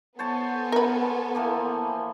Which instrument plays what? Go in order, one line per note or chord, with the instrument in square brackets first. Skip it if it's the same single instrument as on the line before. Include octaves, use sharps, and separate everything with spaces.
[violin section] B3 A4 G#5 [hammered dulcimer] C5 C#5 A5
[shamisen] A#4 B4
[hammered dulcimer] E3 F3 A#3